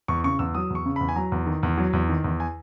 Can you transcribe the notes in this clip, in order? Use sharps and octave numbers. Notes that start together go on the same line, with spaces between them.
E2 C#6
C#3 C#6
E2 E6
F#3 D#6
E2 C#6
C#3
E2 B5
G#5
F#3 A#5
E2
D#3
E2
F#3
E2
D#3
E2
G#5